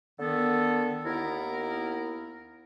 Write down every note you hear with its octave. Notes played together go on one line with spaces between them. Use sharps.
D3 D#3 B3 A4
D#2 B3 E4 A#4